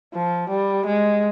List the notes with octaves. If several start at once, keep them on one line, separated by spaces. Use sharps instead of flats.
F3
G3
G#3